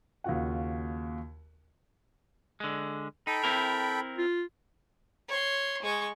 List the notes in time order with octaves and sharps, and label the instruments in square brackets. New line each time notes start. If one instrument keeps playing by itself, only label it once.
[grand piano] D#2 C#3 F4 F#4 F#5
[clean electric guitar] D3 G#3
[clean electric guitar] D#4 [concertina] A4 G5 B5
[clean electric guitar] C4 E4 A#4
[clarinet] F4
[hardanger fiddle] C#5 C6
G#3 C#6